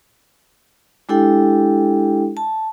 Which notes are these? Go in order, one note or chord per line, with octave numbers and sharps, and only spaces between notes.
G#3 D4 E4 G4 A4 G5
A5